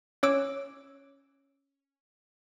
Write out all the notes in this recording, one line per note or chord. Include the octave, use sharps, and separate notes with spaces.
C#4 C#5 D6 E6 D7